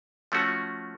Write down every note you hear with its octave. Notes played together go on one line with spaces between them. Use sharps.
F3 A3 C#4 F#4